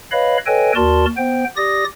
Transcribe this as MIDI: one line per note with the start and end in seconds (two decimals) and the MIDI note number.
0.12 0.37 71
0.12 0.37 73
0.12 0.37 75
0.12 0.37 77
0.12 0.37 83
0.46 0.72 69
0.46 0.72 71
0.46 0.72 73
0.46 0.72 75
0.46 0.72 79
0.46 0.72 80
0.75 1.05 39
0.75 1.05 66
0.75 1.05 70
0.75 1.05 74
0.75 1.05 81
0.75 1.05 84
1.17 1.44 59
1.17 1.44 72
1.17 1.44 79
1.57 1.84 67
1.57 1.84 74
1.57 1.84 87
1.57 1.84 94